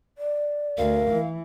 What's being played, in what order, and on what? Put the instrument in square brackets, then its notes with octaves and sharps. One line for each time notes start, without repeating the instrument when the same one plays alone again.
[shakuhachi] D5
[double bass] D2 [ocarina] A#4 [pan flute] F5
[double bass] E3